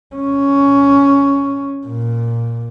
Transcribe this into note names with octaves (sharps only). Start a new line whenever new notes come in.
C#4
A#2